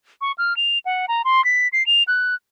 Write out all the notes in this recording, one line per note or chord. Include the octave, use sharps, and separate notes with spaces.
C#6
F6
F7
F#5
A#5
C6
B6
C7
F7
F#6